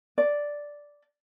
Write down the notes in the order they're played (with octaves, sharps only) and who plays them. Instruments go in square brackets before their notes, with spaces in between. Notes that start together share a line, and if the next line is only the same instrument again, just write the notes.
[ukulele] D5